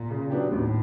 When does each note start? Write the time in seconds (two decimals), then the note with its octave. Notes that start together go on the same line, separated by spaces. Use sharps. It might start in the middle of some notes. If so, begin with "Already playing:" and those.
Already playing: A#2
0.10 C#3
0.30 F#3 B3 D4 G4
0.51 D#2 A2